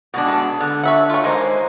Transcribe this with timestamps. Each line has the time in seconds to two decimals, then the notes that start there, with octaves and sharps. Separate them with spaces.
0.14 B2 G#3 D4
0.27 B3 A4
0.60 D3
0.83 C#5 E5 F#5
1.10 F4 C#5
1.24 G#3 A#3 D#4 C5